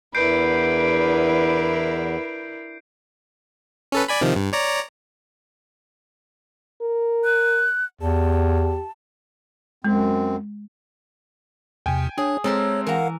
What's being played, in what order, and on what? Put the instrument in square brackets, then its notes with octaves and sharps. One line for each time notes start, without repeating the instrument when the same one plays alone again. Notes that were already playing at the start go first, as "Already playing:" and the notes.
[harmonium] E2 [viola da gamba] D4 E4 A#4 [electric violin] B4 [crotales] G6 C7 D7
[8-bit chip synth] C#4 A4 B4
D5 G#5 B5
C3 D#3 F3
G2
C#5 D5 A#5
[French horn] A#4
[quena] F#6
[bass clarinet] E2 [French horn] G4 [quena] A5
[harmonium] F#2 C4 [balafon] G#3
[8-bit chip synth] E2 C3 [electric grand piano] G5 G#5
[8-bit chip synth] D4 C#5 [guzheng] G#4
[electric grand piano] G#3 C4 [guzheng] A4 A#4 E5 [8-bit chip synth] C#5
[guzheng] E3 A#5 [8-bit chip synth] A#4 F5 F#5